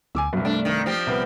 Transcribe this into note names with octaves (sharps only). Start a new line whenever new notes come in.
D2 G#5 D6 E6
C2 G2 F#3
A3 D4
D#3
F3 C4 G4
C2 B3